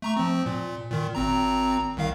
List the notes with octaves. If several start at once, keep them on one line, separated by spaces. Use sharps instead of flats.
A3 A#5 C#6
F3 C4
A#2
A#2 D#3
G#1 C4 A#5
C2 D#3 F5